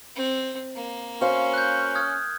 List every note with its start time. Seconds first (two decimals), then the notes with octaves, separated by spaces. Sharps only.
0.15 C4
0.76 A#3
1.21 C#4 F#4 C5 F5
1.54 F#6 G6
1.95 D#6 F6 G#6